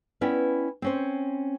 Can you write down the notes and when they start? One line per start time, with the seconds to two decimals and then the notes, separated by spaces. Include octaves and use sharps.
0.21 B3 C#4 E4 D5 G5
0.82 C4 C#4 C5